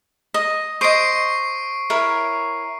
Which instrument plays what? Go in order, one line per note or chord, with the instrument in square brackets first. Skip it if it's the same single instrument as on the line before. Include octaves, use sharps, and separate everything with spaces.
[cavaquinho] D#5
[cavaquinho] C5 D#5 [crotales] C#6 C7 D7
[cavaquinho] E4 A#4 C#5